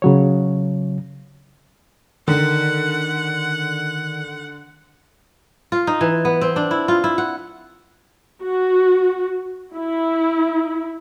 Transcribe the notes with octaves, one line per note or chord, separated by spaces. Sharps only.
C#3 F#3 C#5
D3 D#3 F#5
F4
D#4
E3
B3
C4
D4
E4
F4
E4
F#5
F#4
E4